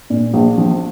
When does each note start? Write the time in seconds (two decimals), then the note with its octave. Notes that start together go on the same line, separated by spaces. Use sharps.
0.10 A#2
0.33 A#1
0.58 F3